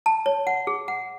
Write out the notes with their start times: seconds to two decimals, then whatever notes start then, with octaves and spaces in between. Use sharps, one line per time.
0.06 A5
0.26 C#5
0.47 F#5
0.67 G#4
0.88 F#5